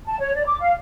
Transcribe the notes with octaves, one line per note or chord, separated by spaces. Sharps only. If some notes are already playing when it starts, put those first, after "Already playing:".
A5
C#5
D5
D6
F5